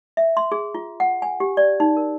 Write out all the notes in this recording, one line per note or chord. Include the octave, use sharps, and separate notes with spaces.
E5
C6
G#4
F4
F#5
G#5
G4
D5
D#4
A#4